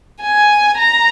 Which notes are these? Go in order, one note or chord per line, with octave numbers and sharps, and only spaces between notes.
G#5
A#5